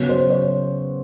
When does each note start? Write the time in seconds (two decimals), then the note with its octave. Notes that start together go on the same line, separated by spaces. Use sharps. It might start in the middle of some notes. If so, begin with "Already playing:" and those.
Already playing: C#3 F#3 B3
0.09 C5
0.30 C#5